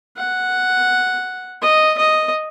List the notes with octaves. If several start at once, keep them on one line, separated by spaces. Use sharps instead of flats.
F#5
D#5
D#5